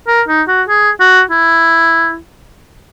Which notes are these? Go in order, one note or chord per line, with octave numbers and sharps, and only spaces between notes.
A#4
D#4
F#4
G#4
F#4
E4